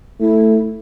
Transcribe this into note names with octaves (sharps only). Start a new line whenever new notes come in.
A3 E4